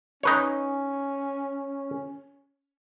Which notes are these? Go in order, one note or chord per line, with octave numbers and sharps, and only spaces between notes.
C#4 D#4 B4 C#5